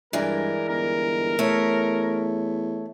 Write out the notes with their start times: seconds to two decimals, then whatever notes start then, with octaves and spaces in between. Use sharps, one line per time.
0.13 G2 E3 G#3 A#4 D5
0.69 G1 A#4
1.39 E2 A3 C#5